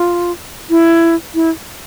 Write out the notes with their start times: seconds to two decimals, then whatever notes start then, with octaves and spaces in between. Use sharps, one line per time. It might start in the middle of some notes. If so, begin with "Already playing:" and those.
Already playing: F4
0.70 E4
1.35 E4